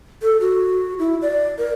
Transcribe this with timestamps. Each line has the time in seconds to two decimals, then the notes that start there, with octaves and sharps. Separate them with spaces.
0.23 A4
0.41 F#4
0.99 E4
1.22 D5
1.58 A#4